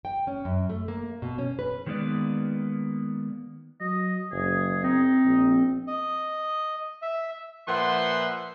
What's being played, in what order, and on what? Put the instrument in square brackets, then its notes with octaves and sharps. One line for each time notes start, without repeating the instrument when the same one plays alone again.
[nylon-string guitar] G5
C#4
F#2
A3
A#3
B2
C#4
B4
[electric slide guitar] D#3 G#3 A#3 B3 B4 D5
[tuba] F#3 [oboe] D#5
[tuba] F#1 [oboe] G#4
[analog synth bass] C4 [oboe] D#4
[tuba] A#1
[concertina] D#5
E5
[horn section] A#2 F3 B4 E5 F#5 C6